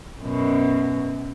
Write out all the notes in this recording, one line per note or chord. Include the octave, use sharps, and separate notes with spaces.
F#2 B2